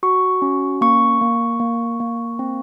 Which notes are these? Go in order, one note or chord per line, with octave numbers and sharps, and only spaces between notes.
F#4 C#6
C#4
A#3 C#6
A#3
A#3
A#3
C4